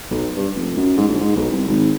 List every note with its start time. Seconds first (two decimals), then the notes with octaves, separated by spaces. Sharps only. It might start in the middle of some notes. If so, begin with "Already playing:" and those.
0.11 B1
0.37 G2
0.55 F1
0.77 F#2
0.97 G#2
1.09 A#1
1.20 G#2
1.36 B1
1.50 C2
1.68 G#1